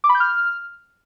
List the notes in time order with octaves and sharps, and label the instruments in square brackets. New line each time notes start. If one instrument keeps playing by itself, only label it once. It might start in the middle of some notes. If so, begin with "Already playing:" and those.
[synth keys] D6
B5
G6
F6